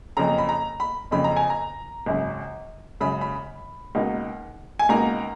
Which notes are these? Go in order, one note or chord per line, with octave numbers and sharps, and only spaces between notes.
F#1 F2 C#3 A#5
B5
A#5
B5
F#1 F2 C#3 B5
A#5
G#5
A#5
G#1 F#2 C#3
G#1 F#2 C#3 B5
B5
C#2 B2 A#3 D#4
G#5
C#2 B2 A#3 D#4 A#5